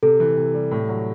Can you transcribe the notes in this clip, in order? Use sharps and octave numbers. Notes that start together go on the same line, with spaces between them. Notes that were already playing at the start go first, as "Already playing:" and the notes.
C3 A4
E3
C3
G3
A2
F#3